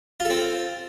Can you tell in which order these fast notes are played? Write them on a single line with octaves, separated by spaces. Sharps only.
F4 A4 C4